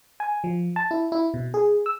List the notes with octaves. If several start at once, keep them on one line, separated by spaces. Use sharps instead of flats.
G#5
F3
A5
E4
E4
B2
G#4
E6